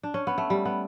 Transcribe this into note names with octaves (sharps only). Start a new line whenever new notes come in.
D4
C#4
B3
A3
G3
B3